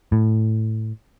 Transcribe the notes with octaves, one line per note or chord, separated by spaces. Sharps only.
A2